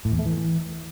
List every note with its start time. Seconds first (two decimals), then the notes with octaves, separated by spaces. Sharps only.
0.05 A2
0.12 E2
0.19 A3
0.26 E3